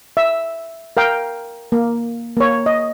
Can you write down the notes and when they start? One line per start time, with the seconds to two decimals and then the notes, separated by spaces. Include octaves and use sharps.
0.17 E5
0.97 A#4 F5 G5
1.72 A#3
2.37 A#3 C#5
2.66 D#5